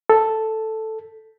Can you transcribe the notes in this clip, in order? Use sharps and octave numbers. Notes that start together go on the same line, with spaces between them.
A4